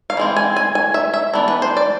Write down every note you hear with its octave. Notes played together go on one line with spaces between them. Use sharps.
F5
E3 G#3 C4
G#5
G#5
G#5
E5
E5
E3 B3 D4
B4
C5
D5